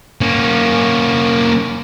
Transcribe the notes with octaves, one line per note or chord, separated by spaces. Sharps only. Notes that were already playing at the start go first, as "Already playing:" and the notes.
A#3 C#4